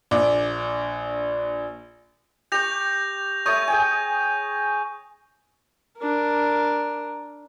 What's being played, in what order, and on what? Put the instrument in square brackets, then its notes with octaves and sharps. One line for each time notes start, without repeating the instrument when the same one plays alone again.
[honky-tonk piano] A#1 D4 D6
[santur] G4 C#6 [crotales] G6 A#6 F7
[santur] A3 C#5 D#6 [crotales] C#6 G6
[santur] G#4 G5 G#5
[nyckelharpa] D4 A#4